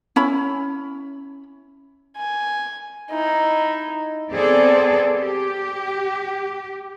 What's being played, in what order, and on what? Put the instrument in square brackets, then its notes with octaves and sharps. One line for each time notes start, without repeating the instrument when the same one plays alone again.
[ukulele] C#4 E4 B5
[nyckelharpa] G#5
D#4 E4
[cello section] B3 C4 G#4 A4 D5
G4